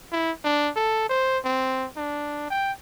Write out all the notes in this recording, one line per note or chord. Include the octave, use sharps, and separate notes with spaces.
E4
D4
A4
C5
C4
D4
G5